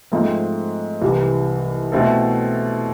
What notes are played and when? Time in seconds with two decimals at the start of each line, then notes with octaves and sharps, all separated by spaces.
0.12 G#2 F3 A3 C4
1.02 C2 C3 E3
1.92 B2 A3 C4 E4 A4